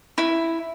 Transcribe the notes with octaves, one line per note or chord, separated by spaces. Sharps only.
E4